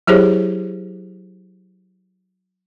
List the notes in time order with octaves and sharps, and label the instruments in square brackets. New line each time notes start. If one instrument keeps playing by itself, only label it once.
[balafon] F#3 E4 G4 G#4 C5 C#5